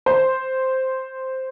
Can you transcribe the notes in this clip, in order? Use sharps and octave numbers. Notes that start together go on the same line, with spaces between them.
C5